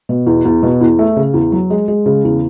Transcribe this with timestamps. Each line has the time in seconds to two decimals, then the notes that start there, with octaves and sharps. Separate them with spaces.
0.09 B2
0.27 E2
0.45 E2
0.63 B2
0.81 E2
0.99 A3
1.16 C#3
1.34 E2
1.52 F#3
1.70 G#3
1.88 G#3
2.06 C#3
2.24 E2